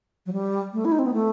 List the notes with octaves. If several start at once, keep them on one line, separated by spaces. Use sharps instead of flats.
F#3
G3
A3
E4
D#4
C4
B3
A3